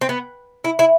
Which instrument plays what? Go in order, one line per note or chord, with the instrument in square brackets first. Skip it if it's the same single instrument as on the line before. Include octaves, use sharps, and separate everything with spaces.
[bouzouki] C4
B3
E4
E4